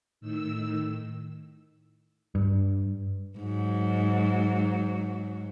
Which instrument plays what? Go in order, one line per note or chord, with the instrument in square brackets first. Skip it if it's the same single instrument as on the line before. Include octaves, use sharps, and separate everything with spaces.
[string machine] A2 D#3 E6
[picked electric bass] G2
[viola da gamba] G#2 F#3